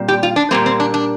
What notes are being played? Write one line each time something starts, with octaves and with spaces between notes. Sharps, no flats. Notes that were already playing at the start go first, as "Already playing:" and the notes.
Already playing: A#2 G3 C4
G4
F4
D4
A#2 G3 A#3 C4
C4
D4
D4